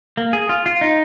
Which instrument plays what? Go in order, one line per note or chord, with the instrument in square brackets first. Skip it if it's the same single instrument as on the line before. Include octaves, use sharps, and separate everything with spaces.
[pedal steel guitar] A#3
G#4
F4
F4
D#4